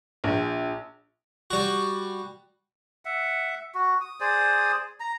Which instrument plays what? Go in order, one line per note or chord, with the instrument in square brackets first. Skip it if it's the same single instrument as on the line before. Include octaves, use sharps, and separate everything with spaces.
[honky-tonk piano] A#1
[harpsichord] G3 F#4
[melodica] E5 F#5
F#4
D#6
G#4 C5 D5 D#6
A#5